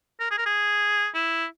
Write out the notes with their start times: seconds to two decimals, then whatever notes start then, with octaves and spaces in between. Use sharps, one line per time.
0.20 A#4
0.31 G#4
0.38 A#4
0.46 G#4
1.14 E4